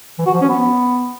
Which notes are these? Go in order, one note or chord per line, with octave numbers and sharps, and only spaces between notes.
E3
F#4
F3
C#4
B3